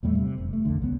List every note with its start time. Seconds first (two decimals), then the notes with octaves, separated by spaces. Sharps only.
0.03 E2 A#2 G3 A3
0.19 C3
0.38 F1
0.53 A3
0.65 C2 F2 D3
0.82 C#2 G#3 B3